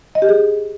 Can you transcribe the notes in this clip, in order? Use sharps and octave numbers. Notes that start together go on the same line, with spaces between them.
D#5
G4
G#4